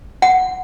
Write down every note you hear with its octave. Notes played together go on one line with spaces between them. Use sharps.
F#5